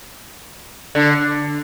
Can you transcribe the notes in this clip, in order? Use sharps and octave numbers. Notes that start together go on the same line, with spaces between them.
D3